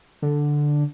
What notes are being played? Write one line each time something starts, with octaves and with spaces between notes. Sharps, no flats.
D3